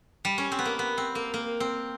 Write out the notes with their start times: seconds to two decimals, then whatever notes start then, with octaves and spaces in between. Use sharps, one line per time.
0.25 G3
0.38 C#4
0.52 C4
0.59 B3
0.65 A#3
0.79 B3
0.98 C4
1.15 A#3
1.34 A#3
1.60 C4